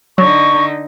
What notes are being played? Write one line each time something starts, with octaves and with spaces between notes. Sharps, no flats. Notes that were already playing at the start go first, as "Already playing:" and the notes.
D3 F#3 D#4 C#6